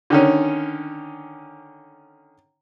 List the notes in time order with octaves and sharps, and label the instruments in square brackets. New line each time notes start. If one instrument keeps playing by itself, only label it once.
[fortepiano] D3 D#3 C#4